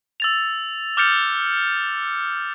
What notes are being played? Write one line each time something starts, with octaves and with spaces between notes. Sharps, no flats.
E6 A6 F7
D6 F6 G6 A6 C#7 F7